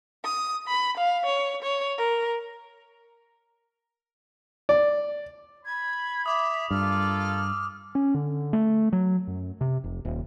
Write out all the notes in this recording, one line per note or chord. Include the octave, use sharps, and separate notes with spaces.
D#6
B5
F5
C#5
C#5
A#4
D5
B5 G#6
E5 D6 D#6
G2 A#3 F4 A4 F6
C#4
D3
A3
F#3
F#2
C3
F1
D#1